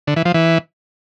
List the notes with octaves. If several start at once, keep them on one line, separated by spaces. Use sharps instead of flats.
D3
E3
F3
E3